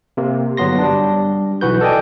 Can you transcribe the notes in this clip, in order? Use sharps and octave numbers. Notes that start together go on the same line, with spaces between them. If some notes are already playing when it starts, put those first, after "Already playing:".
C3 A#3
G1 F#3 B3 C6 A#6
G3 D4
B1 E3 F#4 B4 G6
A4 D5 D#5 G5 G#5